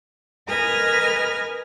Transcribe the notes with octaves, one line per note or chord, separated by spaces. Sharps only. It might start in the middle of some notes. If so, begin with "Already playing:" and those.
A#4 B4 D#5 G#5 D#6 F6